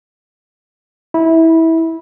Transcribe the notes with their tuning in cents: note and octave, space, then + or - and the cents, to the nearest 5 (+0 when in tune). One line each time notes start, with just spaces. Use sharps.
E4 -20